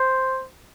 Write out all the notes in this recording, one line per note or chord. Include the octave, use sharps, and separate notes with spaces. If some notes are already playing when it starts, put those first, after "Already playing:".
Already playing: C5